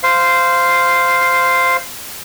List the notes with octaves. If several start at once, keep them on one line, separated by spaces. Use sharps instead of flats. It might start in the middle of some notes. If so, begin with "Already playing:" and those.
C5 F5